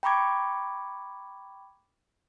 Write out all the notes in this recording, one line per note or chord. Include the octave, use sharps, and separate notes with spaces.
G5 A#5 B5 C#6 D6 G#6